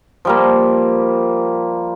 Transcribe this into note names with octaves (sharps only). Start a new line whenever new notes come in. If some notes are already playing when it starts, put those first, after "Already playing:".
F3 G3 A#3